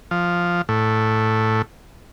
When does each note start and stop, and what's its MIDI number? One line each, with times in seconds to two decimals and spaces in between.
0.11 0.62 53
0.69 1.62 45